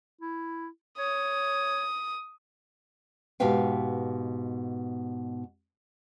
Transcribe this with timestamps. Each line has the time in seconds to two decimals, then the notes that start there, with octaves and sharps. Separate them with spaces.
0.21 E4
0.98 C#5 D#6
3.40 G#2 B2 G4 B4 F5 G5